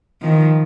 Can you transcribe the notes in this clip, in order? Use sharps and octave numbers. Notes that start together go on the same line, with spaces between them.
D#3 F3